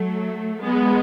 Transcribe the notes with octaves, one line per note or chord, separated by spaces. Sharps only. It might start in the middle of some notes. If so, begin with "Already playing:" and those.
Already playing: F#3 A3
G#3 B3